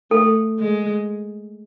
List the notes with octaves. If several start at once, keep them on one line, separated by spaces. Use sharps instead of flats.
A3 A4
G#3